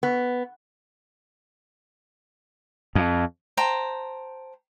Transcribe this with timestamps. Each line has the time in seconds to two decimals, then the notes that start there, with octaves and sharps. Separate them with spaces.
0.03 B3
2.95 F2
3.57 C5 G5 A5 A#5